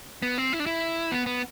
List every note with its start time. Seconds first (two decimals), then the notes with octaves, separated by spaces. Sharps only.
0.22 B3
0.38 C4
0.53 E4
0.60 D4
0.66 E4
1.12 B3
1.26 B3